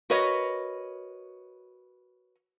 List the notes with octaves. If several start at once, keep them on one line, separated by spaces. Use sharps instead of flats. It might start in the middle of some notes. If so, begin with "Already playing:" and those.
F#4 A#4 B4 C#5 D#5